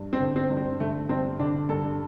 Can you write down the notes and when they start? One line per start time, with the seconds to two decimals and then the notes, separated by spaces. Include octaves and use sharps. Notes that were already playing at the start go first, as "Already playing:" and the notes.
Already playing: G2
0.13 C4
0.20 D3
0.36 C4
0.50 G2
0.57 C4
0.80 D3 A3
1.09 G2 C4
1.40 D3 D4
1.69 G2 A4